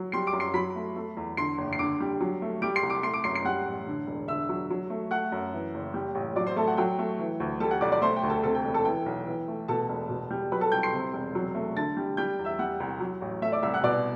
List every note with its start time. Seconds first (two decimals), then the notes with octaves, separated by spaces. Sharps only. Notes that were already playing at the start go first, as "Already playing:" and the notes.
Already playing: F#3
0.12 G3 C6 C7
0.27 D6 D7
0.33 F#2
0.40 C6 C7
0.54 F#3 B5 B6
0.76 A3
0.96 A3
1.17 E2
1.37 D3 C6 C7
1.58 F#1
1.73 C7
1.79 D3 D6 D7
2.00 G3
2.21 F#3
2.42 A3
2.62 G3 D6 D7
2.75 C6 C7
2.83 C2
2.90 D6 D7
3.03 A3 C6 C7
3.13 D6 D7
3.24 F#2 C6 C7
3.34 C6 C7
3.45 G3 F#5 F#6
3.66 A1
3.87 D3
4.07 E1
4.28 D3 E5 E6
4.49 F#3
4.70 F#3
4.90 A3
5.11 A3 F#5 F#6
5.32 F#2
5.54 E3
5.74 F#1
5.94 G3
6.15 A1
6.36 F#3 D5 D6
6.47 C5 C6
6.56 A3 A4 A5
6.68 F#5
6.77 F#3 G5
6.99 A3
7.19 E3
7.40 D2
7.60 G3 A4 A5
7.71 F#5 F#6
7.81 B1 D5 D6
7.92 D5 D6
8.02 A3 C5 C6
8.16 G5
8.23 D2
8.30 A4 A5
8.43 C3 A4 A5
8.55 G5
8.64 E1
8.74 A4 A5
8.85 E3 G5
9.06 B1
9.26 E3
9.48 A3
9.68 B2 A4 A5
9.89 E1
10.09 B2
10.31 G3
10.52 F#3 B4 B5
10.61 A4 A5
10.72 C2 G5 G6
10.83 C6 C7
10.93 C3
11.13 E1
11.35 F#3
11.55 A3
11.76 D3 A5 A6
11.97 G3
12.17 G3 G5 G6
12.39 E2
12.45 E5 E6
12.59 G3 F#5 F#6
12.80 C2
13.00 F#3
13.22 A1
13.42 A3 E5 E6
13.52 D5 D6
13.62 C2 E5 E6
13.74 F#5 F#6
13.83 B2 D5 D6